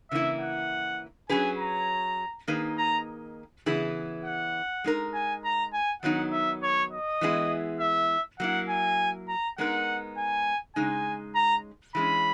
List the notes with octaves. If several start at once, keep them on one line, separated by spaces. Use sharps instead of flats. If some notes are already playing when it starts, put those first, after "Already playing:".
C#3 E3 A#3 E4 E5
F#5
F#3 C#4 G#4 B4 G#5
A#5
D#3 A#3 D#4 G#4 B4
A#5
C#3 E3 B3 E4 G#4
F#5
G#3 D#4 A#4
G#5
A#5
G#5
D#3 F#3 B3 D#4 F#5
E5
C#5
D#5
E3 G#3 B3 E4 G#4
E5
F#3 A#3 E4 F#5
G#5
A#5
G#3 B3 D#4 A#4 F#5
G#5
C#3 G#3 D#4 G#5
A#5
E3 G#3 C#4 B5